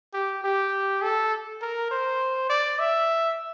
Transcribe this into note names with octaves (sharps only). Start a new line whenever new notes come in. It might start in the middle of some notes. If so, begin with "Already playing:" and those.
G4
G4
A4
A#4
C5
D5
E5